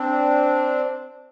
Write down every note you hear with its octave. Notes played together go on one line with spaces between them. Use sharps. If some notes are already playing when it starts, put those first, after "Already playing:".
Already playing: C4 D4